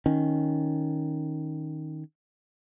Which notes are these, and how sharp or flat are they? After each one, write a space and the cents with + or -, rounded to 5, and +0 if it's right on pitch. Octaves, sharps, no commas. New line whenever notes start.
D#3 +0 C#4 +0